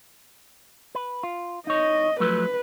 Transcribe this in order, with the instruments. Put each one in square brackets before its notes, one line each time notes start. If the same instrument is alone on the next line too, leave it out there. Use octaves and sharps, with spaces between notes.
[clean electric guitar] B4
F4
[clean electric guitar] D#4 C#5 [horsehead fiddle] D#5
[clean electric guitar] F3 F#3 A3 [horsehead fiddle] B4